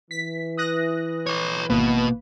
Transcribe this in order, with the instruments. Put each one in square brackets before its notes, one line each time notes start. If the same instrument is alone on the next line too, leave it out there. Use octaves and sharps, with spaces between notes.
[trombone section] E3 [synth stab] B6
[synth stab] D#6 F#6 A#6
[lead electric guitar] B4 C#5
[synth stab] G#1 B4 [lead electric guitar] B2 [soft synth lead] A#3